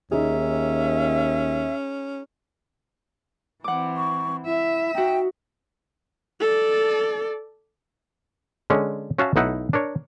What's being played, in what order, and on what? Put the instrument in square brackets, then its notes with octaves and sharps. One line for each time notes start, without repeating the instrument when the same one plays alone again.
[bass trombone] D#2 [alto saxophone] C#4 [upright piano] D#4 G#4 [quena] E5
[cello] E3 C4 [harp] F#5 D6
[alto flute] C#6
[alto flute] E4 [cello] E5
[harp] D#4 F#4 [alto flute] G5
[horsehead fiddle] A4 D5
[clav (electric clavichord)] D3 G#3 C#4
C#4 F#4 E5 F5 A5
B1 A3 D#4 E4 F#5
D4 A#4 C#5